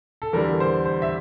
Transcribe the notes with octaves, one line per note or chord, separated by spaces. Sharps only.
A4
E2 D3 G3 A#4
C5
C5
E5